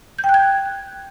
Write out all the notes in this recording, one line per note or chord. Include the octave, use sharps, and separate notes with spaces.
G6
G5
F#6
G#6